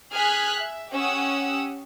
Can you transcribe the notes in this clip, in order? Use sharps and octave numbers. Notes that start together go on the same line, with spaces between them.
G#4 G#5 F6 F#6 B6
E5
C#4 G4 F#5 D#6 E6